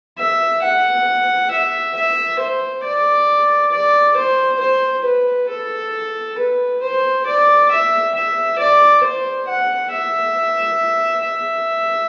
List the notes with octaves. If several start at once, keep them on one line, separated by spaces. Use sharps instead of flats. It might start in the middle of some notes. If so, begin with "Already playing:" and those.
E5
F#5
E5
E5
C5
D5
D5
C5
C5
B4
A4
B4
C5
D5
E5
E5
D5
C5
F#5
E5
E5